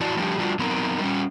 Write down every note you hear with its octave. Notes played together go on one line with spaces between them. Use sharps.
F2 E3 E4 F#4 D5 A5
F3 G3 A3 D4 G4
G3 D4 F4 F#4
F#3 B3 C4 D#4 A#4
G3 C#4